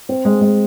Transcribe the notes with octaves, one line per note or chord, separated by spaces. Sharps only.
C4
G#3
G#3